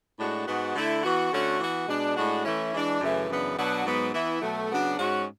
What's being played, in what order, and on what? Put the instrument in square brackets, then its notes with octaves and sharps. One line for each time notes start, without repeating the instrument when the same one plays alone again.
[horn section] A2 G#3 D4 F#4
G#2 G#3 B3 F#4
D3 A3 E4
E3 B3 F#4
D3 A3 C#4 F#4
E3 B3 F#4
B2 G#3 D4
A2 G#3 D4 F#4
E3 A3 C#4 E4
E3 G#3 D4
F#2 C#3 E3 A3
F#2 C#3 E3 B3 D4
B2 F#3 B3 D4 F#4
G#2 F#3 B3
E3 B3 E4
B2 F#3 A3
C#3 F#3 B3 D4 F#4
G#2 G#3 C#4 F#4